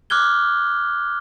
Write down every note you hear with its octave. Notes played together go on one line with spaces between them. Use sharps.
D6 F6 F#6 G#6 G7